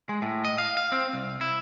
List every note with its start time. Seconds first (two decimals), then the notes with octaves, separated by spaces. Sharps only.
0.09 G#3
0.22 A2
0.45 D#5
0.58 F5
0.77 F5
0.92 C4
1.13 C2
1.41 E4